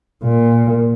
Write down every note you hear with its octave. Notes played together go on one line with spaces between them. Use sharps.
A#2